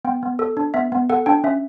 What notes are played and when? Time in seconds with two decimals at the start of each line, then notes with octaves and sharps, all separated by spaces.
0.05 B3 G5
0.23 B3
0.39 A4
0.57 D4
0.74 B3 E5
0.92 B3
1.10 A4 F#5
1.26 D4 G5
1.44 C#4 E5